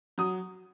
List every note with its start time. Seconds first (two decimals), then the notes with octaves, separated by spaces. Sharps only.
0.18 F#3 D#6